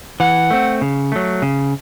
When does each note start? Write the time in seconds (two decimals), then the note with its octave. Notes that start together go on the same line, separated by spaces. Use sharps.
0.20 E3 F#5
0.51 A3 C4
0.81 C#3
1.12 F#3 A3
1.42 C#3